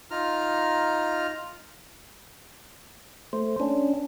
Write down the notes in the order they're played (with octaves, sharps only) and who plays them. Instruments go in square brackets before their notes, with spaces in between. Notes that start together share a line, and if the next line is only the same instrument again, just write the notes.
[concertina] D#4 F4 A#5 F6
[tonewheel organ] A3 C5
C#4 D4